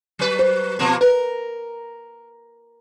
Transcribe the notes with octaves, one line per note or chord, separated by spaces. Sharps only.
F#3 B4
C5
B2 F3 A#3
A#4 B4